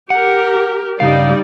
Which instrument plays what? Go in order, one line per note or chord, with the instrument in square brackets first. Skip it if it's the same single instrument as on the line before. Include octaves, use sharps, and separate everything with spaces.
[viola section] G4 A#4 [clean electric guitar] F#5
[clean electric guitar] G2 C#3 F5 [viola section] G3 D#4 D5